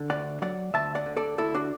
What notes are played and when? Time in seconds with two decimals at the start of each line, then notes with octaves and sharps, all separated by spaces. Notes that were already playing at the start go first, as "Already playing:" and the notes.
Already playing: D3
0.10 D2 D5 F#5
0.42 F#3 D5 F#5
0.74 D2 E5 A5
0.95 D5 F#5
1.06 D3
1.17 A4 D5
1.38 D2 E4 A4
1.54 D4 F#4